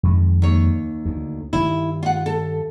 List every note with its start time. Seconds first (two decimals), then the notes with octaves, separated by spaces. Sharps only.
0.03 F2 D#3 G#3
0.42 D#2 C#5
1.05 D2
1.53 G2 D#3 E4
2.03 F4 F#5
2.26 A4